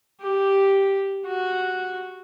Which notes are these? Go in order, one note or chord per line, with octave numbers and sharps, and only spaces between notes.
G4
F#4